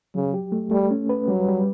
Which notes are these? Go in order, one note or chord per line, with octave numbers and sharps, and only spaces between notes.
C#3 F#3
G4
A3
G3 A3
C#4
B4
F#3 G3
G3